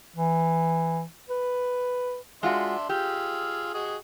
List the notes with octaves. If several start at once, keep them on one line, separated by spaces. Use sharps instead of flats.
E3
B4
G#3 D4 F4 F#4 E5 C6
F4 G4 G#4 E6
F#4 G#4 D#5